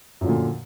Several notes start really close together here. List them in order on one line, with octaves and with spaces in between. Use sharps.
F#2 F3 D3 A#2